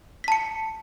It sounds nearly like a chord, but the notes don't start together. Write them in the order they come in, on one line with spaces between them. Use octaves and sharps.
B6 A5 C#7